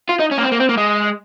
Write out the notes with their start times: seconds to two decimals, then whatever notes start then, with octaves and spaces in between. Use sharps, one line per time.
0.09 F4
0.20 D#4
0.31 C#4
0.38 A#3
0.43 C4
0.52 A#3
0.60 C4
0.69 A#3
0.78 G#3